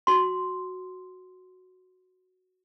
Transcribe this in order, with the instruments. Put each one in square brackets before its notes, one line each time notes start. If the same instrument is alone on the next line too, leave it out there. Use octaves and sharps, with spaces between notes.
[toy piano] F#4 C6